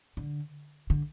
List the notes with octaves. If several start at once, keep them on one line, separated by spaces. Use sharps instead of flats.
D3
D3